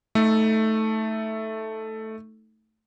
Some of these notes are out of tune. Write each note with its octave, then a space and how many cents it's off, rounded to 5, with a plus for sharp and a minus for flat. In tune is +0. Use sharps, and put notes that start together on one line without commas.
A3 +0 D#4 +25 A4 +0